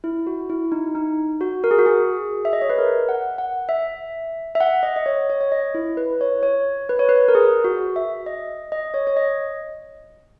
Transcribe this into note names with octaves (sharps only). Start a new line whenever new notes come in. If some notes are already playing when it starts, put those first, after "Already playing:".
E4
F#4
E4
D#4
D#4
F#4
A#4
G#4
F#4
G#4
E5
D#5
C#5
B4
A#4
F#5
F#5
E5
E5
F#5
D#5
D#5
C#5
C#5
C#5
D#5
E4
B4
C#5
C#5
B4
C#5
B4
A#4
G#4
F#4
E5
D#5
D#5
C#5
C#5
D#5